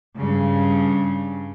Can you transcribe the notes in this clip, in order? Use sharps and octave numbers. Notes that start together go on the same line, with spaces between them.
G2 C#3